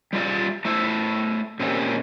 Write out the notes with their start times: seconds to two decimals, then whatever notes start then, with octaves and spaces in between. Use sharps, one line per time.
0.13 G3 A3 F4 D5 E5
0.65 A3 E4 A4 C5 E5
1.60 A#2 C4 C#4 G4 E5